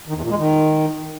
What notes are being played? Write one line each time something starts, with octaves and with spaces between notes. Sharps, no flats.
D#3
E2
A#2
G#3
D#3